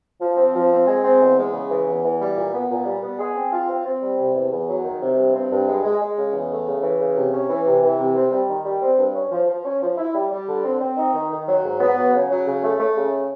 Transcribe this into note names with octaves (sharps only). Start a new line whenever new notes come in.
F3
C4
F3
C4
G#3
C4
E2
G#3
C#3
E3
E2
E3
G3
A#2
B3
A#2
G3
B3
G#4
C4
F4
C4
C4
G3
C3
E2
E2
F#3
D#3
C3
G2
C4
G2
G#3
G#3
G#3
C#3
E2
A3
C#3
E3
C#3
C3
C#4
E3
C3
E3
C3
C4
G3
D#3
G3
C4
G2
C#4
F3
F3
C#4
F3
E4
G3
G3
D3
C4
C4
D#4
D#3
D#3
F#3
G#2
B3
F#3
C#3
F#3
C#3
A3
A3
C#3